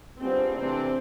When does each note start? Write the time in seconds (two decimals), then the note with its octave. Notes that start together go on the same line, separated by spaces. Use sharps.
0.20 G3 B3 C4 D4 F4 G#4
0.56 C3 E3 A3 C4 D4